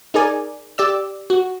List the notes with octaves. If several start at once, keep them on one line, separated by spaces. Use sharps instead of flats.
D#4 G#4 A#4 D5 G#5
G4 D5 E6
F#4